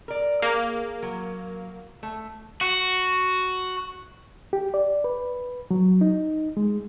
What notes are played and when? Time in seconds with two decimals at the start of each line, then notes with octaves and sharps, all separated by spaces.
0.08 A#4 D5
0.42 A#3 G#4
1.02 F#3
2.03 A3
2.61 F#4
4.53 G4
4.74 D5
5.04 B4
5.71 F#3
6.01 D#4
6.57 G#3